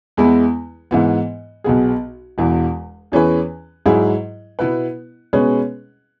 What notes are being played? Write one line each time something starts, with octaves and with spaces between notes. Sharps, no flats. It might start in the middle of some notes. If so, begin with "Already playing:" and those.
E2 E3 G#3 B3 E4
G#2 E3 B3
B1 B2 B3 G#4
E1 E2 E3
E2 E3 C#4 G#4 B4
G#2 F#3 E4 G#4
B2 B3 E4 B4
B2 G#3 C#4 G#4 B4